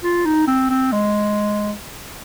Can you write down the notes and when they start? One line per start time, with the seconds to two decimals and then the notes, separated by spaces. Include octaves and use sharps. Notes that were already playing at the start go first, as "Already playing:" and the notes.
0.03 F4
0.25 D#4
0.47 C4
0.70 C4
0.92 G#3